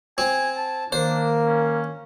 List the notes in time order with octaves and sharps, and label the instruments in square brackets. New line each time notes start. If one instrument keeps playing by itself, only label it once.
[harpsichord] C4 [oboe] G#5
[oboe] A5
[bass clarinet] D#3 [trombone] A#3 [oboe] D4 [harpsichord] C5
[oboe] C#4